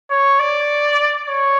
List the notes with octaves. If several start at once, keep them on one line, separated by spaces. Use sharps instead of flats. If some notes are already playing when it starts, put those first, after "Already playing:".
C#5
D5
C#5